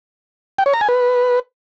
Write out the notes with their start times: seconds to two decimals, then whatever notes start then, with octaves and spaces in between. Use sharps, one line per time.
0.58 G5
0.66 C#5
0.74 A#5
0.81 G#5
0.89 B4